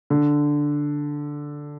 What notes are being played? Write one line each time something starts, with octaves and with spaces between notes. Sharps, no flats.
D3